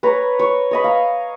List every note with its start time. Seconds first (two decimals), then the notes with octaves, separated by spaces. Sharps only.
0.03 B4 C#5 A#5
0.39 C#5
0.71 C#5 D#5 B5
0.84 F5 A#5